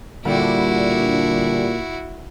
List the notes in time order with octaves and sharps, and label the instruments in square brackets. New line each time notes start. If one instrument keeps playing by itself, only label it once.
[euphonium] A#2 [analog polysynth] D3 G3 D7 [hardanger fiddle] E4 F#4